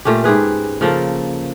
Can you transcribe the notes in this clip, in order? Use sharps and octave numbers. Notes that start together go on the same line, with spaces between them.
A#2 A3 C#4 G4
G#2 G4 G#4 B4
C#3 F3 A#3 A4